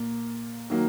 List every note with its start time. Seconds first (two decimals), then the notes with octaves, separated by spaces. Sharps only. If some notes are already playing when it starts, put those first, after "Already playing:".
Already playing: A#2 A#3
0.70 D#3 F#3 A#3